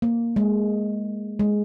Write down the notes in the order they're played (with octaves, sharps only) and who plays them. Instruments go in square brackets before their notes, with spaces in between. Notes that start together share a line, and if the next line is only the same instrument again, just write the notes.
[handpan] A#3
G#3
G#3